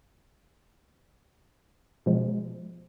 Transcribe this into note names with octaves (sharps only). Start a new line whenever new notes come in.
B2 F3 G#3